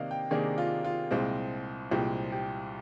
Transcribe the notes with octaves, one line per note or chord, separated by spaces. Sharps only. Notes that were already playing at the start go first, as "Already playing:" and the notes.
Already playing: C3 D#3 A#3 D4 D#5 F5
G5
C3 D#3 A#3 D4 G#4
F4
F4
C2 A#2 G#3 C4
C2 A#2 G#3 C4 G4
G4